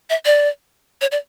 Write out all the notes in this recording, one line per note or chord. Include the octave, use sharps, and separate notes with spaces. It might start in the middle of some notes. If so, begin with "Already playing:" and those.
E5
D5
C#5
D5